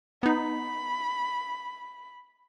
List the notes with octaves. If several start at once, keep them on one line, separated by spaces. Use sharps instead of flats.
B3 D#4 B5